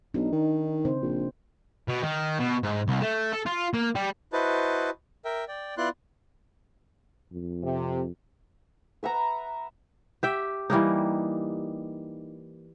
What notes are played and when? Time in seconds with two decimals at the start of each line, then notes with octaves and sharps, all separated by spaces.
0.14 B1 D4 D#4
0.32 D#3
0.85 C#3 C4 C5
1.02 A#1
1.88 B2
2.03 D#3
2.40 B2
2.63 G#2
2.88 C2
3.01 A3
3.32 A4
3.46 F4
3.74 A#3
3.95 G3
4.33 E4 F#4 B4 C5 D#5 A5
5.25 A#4 E5 G5
5.48 D5 G5
5.77 B3 E4 F4 D5 C6 F#6
7.33 F2
7.64 C3
9.03 B4 E5 F#5 A#5
10.23 G4 E5 G5
10.70 E3 G3 A#3 D#4